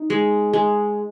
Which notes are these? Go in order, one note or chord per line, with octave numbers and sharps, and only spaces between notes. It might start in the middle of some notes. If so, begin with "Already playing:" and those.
Already playing: D#4
G#3
G#3